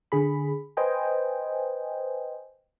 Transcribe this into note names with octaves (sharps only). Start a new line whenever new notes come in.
D3 G#4 B5
B4 C5 D#5 G5 G#5